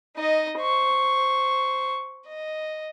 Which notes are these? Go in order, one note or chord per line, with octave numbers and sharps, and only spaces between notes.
D#4 D#5
C5 C#6
D#5